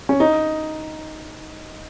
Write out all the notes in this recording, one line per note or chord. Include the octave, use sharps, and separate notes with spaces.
C#4
D#4